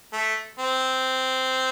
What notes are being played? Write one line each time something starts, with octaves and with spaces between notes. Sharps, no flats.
A3
C4